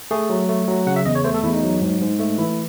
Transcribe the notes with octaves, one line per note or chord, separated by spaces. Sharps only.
A3 G#4
F#3
A3
F#3
C#3 F#5
E5
E2 D#5
C#5
A3 C5
A4
E2 E4
D#4
F#3
G#2
G#2
A3
E3 E4